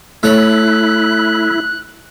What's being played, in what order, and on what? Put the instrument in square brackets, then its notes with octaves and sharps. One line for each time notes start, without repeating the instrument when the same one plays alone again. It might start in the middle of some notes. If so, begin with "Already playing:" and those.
[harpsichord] A3 C#5 [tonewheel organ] E4 [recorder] F#6